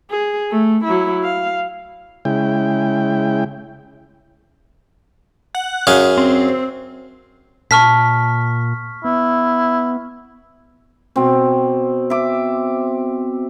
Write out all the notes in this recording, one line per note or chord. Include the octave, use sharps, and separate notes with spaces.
G#4
A3
F#3 E4
F5
C#3 G#3 E4 G5
F#5
F#2 G#4 F5
C4
A#2 A5 C#6 F6 B6
B3 E4
B2 C4
E5 D6